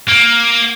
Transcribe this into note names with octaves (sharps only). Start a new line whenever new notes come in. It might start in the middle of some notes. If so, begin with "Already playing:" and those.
A#3